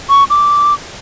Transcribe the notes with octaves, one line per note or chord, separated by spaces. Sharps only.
C#6
D6